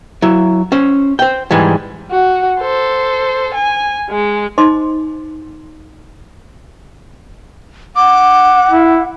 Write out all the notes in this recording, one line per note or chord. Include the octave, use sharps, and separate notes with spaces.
F#3 E4
C#4 C5
C5 G5
G#2 E3 G3 G#3
F#4
A4 C5
G#5
G#3
D#4 C5 D#5 C6 D6
F#5 D6
E4